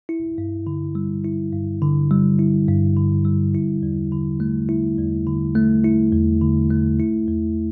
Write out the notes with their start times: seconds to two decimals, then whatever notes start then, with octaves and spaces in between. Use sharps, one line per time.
0.09 E4
0.38 G2
0.67 D3
0.95 G3
1.25 E4
1.53 G2
1.82 D3
2.11 G3
2.39 E4
2.68 G2
2.96 D3
3.25 G3
3.55 E4
3.83 E2
4.12 D3
4.40 A3
4.69 E4
4.98 E2
5.27 D3
5.55 A3
5.84 E4
6.13 E2
6.41 D3
6.70 A3
7.00 E4
7.28 E2